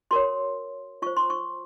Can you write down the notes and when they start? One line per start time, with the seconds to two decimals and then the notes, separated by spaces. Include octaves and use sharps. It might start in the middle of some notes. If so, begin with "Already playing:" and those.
0.11 F#4 A#4 C#5 C6
1.02 F4 C5 C#6
1.17 C6
1.30 C#6